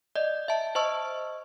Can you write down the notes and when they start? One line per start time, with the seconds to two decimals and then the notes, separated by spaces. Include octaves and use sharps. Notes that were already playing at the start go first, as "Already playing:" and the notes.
0.15 D5 D#5
0.48 E5 A5
0.75 C5 D#5 A5 C#6 E6